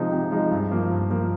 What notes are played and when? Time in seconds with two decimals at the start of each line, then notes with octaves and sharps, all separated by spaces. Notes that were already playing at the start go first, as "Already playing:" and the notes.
Already playing: C3 F3 G#3 D#4
0.12 C3
0.31 F3 G#3 D#4
0.51 G2
0.71 F3 A#3
0.91 G2
1.10 F3 A#3